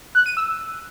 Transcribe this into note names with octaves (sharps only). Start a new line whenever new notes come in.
F#6
D#7
E6